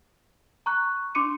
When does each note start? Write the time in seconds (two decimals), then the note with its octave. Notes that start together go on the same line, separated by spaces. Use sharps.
0.66 A#5 C#6 F#6
1.15 D4 C6 D6 C#7 D#7